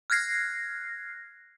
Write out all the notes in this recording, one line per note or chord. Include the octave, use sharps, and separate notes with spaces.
F6 F#6 G#6 A#6 C7